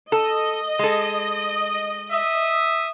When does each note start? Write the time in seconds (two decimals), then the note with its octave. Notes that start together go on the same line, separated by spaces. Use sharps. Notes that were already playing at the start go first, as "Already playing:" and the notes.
0.12 A4 D#5
0.79 G#3 A4
2.12 E5 D#6